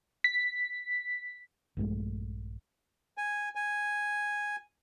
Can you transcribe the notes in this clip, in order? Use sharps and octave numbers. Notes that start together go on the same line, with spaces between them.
B6
A#1 G2 G#3 A3
G#5
G#5